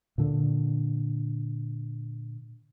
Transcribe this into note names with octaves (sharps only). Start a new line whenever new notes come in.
A#2 D3